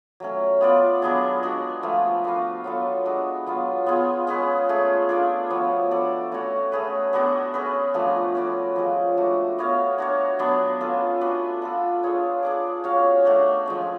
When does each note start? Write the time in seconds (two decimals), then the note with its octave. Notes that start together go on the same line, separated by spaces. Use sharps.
0.20 F#3 A3 C#4
0.61 B3 F4 B4 D5
1.02 F#3 B3 D4 G#4
1.43 G#3 D4 F#4
1.83 F3 A3 F4
2.24 D4 F#4 B4 F5
2.64 F#3 B3 F4 A4
3.05 G#3 D4 F#4
3.47 F#3 B3 F4
3.86 B3 F4 G#4
4.27 G#3 C#4 G#4 B4
4.69 A3 C#4 G#4
5.09 D4 F4 A4 D5
5.50 F3 B3 F#4 C#5
5.91 D4 F#4 A4 D5
6.32 A3 C#4 F#4 C#5
6.72 A3 C#4 G#4 B4
7.13 B3 D4 F#4 A4
7.54 C#4 G#4 B4
7.94 F3 A3 D4 F#4
8.35 C#4 F#4 B4 D5
8.76 F3 G#3 C#4
9.17 A3 D4 F#4
9.58 B3 F#4 C#5 F5
9.98 D4 F#4 C#5
10.39 F#3 B3 D4
10.81 C#4 F4 A4
11.21 D4 F#4 B4
11.62 D4 F4 A4
12.03 D4 F4 G#4 C#5
12.43 D4 G#4 D5
12.84 C#4 F#4 C#5 F5
13.25 A3 D4 F#4
13.66 F3 G#3 C#4